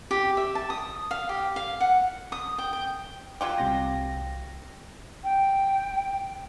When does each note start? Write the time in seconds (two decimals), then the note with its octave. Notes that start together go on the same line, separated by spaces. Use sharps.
0.11 G4
0.37 E5
0.55 A5
0.70 D#6
1.11 F5
1.29 G4
1.56 F5
1.81 F#5
2.32 D#6
2.58 G5
2.73 G5
3.41 F#3 F4 G4
3.58 C2 C3 A#6
5.23 G5